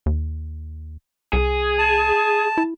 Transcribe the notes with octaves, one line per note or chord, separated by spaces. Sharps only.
D#2
C2 G#4
A5
E4